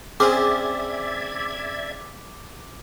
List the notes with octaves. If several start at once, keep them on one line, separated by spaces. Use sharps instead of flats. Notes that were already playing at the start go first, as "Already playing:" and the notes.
C4 C#4 G#4 D5 E5 D6 G#6